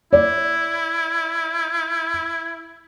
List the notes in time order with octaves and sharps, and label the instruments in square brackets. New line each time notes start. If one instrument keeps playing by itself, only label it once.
[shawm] E4 [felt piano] D5